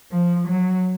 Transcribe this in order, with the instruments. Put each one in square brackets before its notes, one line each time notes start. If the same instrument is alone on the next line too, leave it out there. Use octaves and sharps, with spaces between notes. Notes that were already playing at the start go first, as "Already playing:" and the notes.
[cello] F3
F#3